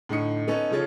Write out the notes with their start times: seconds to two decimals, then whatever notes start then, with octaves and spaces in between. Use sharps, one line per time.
0.09 A2 D3 D#4 D#6 C#7
0.47 B3 C#4 D#4 A4
0.71 C#3 F3 F4 A4 C#5